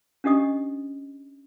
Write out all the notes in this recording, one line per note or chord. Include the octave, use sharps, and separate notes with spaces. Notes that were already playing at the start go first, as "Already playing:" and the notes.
C#4 D4 G4 D#5 D#6